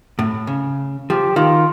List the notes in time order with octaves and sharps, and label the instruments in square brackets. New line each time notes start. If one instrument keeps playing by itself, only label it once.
[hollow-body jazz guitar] A2
C#3
[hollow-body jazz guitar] F3 [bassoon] G4
[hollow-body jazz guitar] D#3 [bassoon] F4